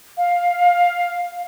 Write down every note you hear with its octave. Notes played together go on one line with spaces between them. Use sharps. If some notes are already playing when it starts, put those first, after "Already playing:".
F5